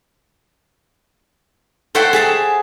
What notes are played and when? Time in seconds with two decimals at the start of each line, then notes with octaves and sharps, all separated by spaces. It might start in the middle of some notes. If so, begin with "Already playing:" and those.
1.95 A4 C5 C#5 E5 F#5 G5
2.13 G#4 E5 A5